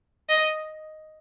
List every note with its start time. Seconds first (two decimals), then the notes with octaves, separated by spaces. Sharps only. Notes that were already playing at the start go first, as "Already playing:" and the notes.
0.29 D#5